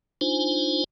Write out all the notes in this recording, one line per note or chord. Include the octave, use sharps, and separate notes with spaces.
D4 D#4 F4 C5 G#5